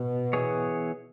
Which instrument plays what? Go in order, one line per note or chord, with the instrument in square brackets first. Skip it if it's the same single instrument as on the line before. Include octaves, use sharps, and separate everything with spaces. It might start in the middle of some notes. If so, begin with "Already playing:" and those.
Already playing: [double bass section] B2
[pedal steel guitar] E3 B3 G#4 C#5